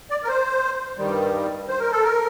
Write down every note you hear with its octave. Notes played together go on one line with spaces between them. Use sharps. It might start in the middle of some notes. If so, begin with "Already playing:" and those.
D5
A#4
C5
G2 D#3 G3
C5
A#4
A4
A#4